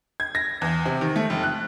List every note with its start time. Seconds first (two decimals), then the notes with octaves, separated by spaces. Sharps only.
0.20 G#6
0.35 A#6
0.61 E2
0.86 C3
1.01 D#3
1.16 A3
1.30 F1
1.43 F#6